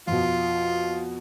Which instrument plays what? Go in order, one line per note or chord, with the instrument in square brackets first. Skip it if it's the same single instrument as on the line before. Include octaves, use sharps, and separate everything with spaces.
[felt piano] F2 B2 [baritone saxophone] F4